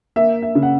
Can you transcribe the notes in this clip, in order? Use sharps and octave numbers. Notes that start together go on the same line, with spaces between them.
A#3 E5
E5
C#3
F#5